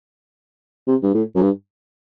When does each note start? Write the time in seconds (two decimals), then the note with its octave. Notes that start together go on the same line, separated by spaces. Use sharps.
0.87 C3
1.03 G2
1.15 A2
1.36 F#2
1.42 G2